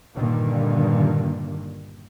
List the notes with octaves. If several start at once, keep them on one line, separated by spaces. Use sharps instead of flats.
G2 A#2 D3 D#3